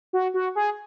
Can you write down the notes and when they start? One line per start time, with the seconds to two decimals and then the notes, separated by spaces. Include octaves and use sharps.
0.13 F#4
0.34 F#4
0.55 G#4